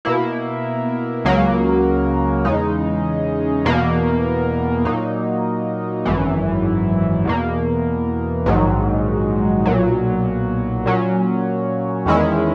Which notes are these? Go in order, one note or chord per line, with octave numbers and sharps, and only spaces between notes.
B2 A#3 E4
C#2 C#3 F#3 A#3
E2 C#3 G#3 D#4
E2 B2 A#3
A#2 F#3 A#3 D#4
G#1 F#2 E3
E2 B2 A#3
A#1 G#2 D#3 F#3
B1 A#2 F#3
A#2 F#3 C#4
E2 D#3 G#3 C#4 E4